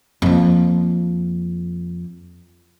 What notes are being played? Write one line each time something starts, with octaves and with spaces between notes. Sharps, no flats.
F2 A#3